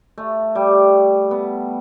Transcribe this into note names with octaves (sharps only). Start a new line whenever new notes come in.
A3
G3
B3